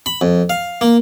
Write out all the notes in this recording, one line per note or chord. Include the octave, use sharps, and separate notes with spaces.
B5
F2
F5
A#3